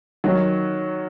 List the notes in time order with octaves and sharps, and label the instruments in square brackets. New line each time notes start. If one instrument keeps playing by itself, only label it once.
[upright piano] D#3 F#3